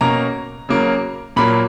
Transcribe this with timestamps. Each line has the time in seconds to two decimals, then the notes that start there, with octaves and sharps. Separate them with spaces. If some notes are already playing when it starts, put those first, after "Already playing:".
0.01 B2 A#3 C#4 A#5
0.69 C#3 F#3 A#3
1.36 A#2 F#3 A#3 B5